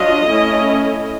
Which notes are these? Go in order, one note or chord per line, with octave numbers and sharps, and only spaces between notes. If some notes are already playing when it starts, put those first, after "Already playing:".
Already playing: F#3 D4 F4 D#5
A3 C#4 E4